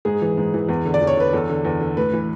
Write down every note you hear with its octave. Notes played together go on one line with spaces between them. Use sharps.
G#2 G#4
E3
G#2
E3
E2
D3
D5
E2
C#5
D3 B4
E2 A4
D3
E2
D3
A2 B4
E3